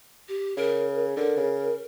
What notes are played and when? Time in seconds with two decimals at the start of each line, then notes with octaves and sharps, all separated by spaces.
0.29 G4
0.57 C#3 A#4
1.17 D3 A#4
1.37 C#3